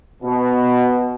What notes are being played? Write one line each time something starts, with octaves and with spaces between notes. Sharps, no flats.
B2